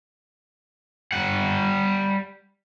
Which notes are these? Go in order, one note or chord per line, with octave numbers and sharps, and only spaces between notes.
G3 F#5